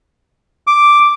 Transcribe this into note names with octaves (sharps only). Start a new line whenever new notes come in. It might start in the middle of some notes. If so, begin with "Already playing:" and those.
D6